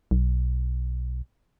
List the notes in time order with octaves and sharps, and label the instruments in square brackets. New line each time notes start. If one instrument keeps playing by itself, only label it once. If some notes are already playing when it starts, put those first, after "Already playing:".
[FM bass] B1